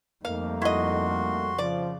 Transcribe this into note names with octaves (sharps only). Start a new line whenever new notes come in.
F2 G3 A3 A#3 D#4 F5
E4 F#4 D#5 C6
C#3 F3 D5